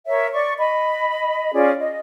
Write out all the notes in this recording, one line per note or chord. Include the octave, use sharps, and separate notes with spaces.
A#4 C#5 E5
D5 C#6
D#5 B5
C#4 F4 G#4 D5
D#5